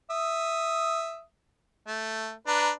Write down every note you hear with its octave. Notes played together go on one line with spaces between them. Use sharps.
E5 D#6
A3
D4 B4 A#5